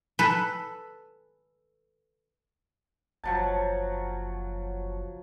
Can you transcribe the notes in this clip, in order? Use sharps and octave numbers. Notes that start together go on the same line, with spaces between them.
A4 B4
F#1 F3 F#3 A5